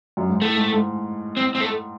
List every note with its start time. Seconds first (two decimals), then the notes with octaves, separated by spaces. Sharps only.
0.17 F#2
0.29 G#2
0.41 A2 A3
0.56 G#2
0.73 G#2
1.37 C4
1.55 C4
1.60 A3